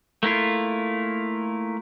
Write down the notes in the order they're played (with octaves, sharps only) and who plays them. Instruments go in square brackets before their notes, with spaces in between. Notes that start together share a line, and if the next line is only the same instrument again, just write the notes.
[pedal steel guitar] A3 A#3 E4 F4